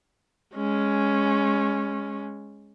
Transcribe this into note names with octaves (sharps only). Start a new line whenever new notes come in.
G#3 C#4